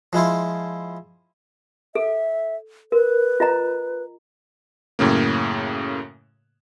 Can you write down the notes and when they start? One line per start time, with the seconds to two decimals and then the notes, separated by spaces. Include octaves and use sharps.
0.13 F3 G#3 E4 F4
1.95 A4 E5
2.92 A#4 B4
3.40 F4 D#5 A#5
4.99 F#2 A2 C#3 A#3